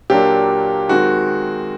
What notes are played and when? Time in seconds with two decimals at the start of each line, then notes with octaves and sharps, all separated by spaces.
0.10 A#2 F#3 A#3 D4 G4
0.89 D#3 G#3 C4 F#4